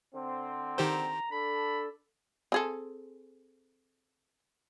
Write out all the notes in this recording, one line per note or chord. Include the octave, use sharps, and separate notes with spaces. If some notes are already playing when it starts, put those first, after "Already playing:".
D3 C4
D#3 G4 C5 A#5
D4 A4 B5
C4 G#4 A4